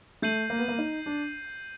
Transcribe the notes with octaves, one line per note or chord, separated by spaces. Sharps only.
A3 G6 C7 D#7 F#7
A#3
B3
A#3
D#4
D4